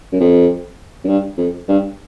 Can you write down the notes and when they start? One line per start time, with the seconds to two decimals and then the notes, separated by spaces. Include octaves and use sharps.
0.12 F#2
0.20 F2
1.04 F#2
1.08 G2
1.38 F2
1.68 G2